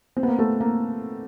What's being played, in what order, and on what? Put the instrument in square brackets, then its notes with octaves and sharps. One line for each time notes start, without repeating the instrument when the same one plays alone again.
[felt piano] C4
B3
A#3
A3
A#3